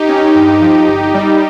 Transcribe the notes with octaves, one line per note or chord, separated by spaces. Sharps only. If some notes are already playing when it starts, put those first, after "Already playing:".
Already playing: D#4 G4
C#4
G2
F3
G1
G3